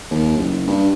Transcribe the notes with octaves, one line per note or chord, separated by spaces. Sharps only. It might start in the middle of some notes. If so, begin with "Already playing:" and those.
D#2
F#1
G2